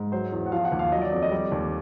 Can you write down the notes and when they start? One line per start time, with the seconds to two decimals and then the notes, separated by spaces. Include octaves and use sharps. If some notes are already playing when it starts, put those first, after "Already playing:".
Already playing: G#2
0.12 F#3 C5
0.32 E2
0.46 F#5
0.52 F3 F5
0.65 F#5
0.72 D#2
0.79 F5
0.92 F#3 D#5
1.02 D5
1.12 F2 D#5
1.23 D#5
1.31 G3 D5
1.52 D#2